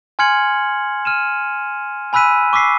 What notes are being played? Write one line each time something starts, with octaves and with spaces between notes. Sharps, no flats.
G#5 C6 F6 G#6 C#7 F#7
F6 D#7 E7
G#5 B5 E6 F#6 B6 D#7
C#6 D6 E6 B6 C7